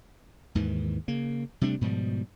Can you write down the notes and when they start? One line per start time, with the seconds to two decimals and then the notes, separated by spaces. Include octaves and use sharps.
0.55 D#2 G#2 D#3 E3
1.08 C#3 A#3
1.61 C3 G3 A3 D4
1.81 G#2 B2 F3 G3